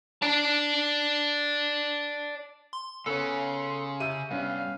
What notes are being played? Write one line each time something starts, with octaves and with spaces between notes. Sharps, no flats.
D5 A5
C6
C#3 B3 C#4 A4 C#5 C6
C3 E6 G6 D#7
G2 B3 C#4 F5